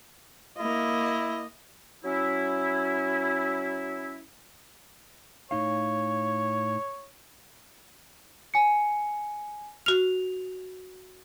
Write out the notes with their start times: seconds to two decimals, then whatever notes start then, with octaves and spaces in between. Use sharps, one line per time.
0.58 A#3 E4 D#5
2.04 F#3 C#4 E4
5.51 A2 D#4 C#5 F5
8.54 G#5 C#7
9.86 F#4 F6 F7